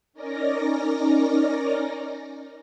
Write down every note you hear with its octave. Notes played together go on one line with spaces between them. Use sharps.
C#4 D#4 A#4 D5 A#6